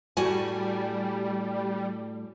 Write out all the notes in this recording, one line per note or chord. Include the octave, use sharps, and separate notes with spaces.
A2 G3 F#4 G#5